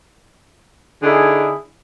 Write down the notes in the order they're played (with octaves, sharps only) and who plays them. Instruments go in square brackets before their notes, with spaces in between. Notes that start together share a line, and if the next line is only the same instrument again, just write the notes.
[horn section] D3 D#4 E4 G#4